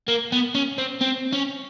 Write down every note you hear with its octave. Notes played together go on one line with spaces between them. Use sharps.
A#3
B3
C#4
C4
C4
C#4